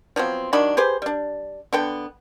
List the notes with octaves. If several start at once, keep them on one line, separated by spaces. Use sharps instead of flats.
F3 F#3 B3 C4
D#3 F#3 D4 B5
G4 G#4 B4 C5
G3 D4
D3 B3 G5